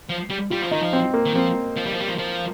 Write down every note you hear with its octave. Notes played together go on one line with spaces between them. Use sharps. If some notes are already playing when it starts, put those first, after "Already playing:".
F3
G3
G3 F4
F3
D#3 D#4
F3
C4
A#3
D#3
F3 C4
F3
G3
F3
G3
F3
F3